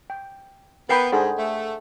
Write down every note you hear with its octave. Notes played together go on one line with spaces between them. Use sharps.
G5
B3 A#4 B4 F#5 G5 B5 C7
G#2 D4 G#4 A4 C5 F#5
A3